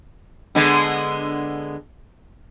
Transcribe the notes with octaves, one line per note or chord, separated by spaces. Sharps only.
D3 G#3 B3